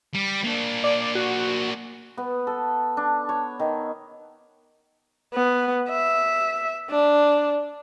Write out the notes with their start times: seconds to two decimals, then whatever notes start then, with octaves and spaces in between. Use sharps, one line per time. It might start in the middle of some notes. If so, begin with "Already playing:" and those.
0.15 G3
0.45 A#3 D4
0.84 D5
1.02 D5
1.15 F#4
2.17 B3
2.47 A4
2.97 D4
3.29 C#5
3.60 D#3
5.34 B3
5.89 E5
6.90 D4